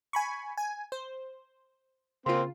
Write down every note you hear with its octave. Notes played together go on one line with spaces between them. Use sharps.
G#5 B5 C#6
G#5
C5
C#3 A#3 C4 F4 C6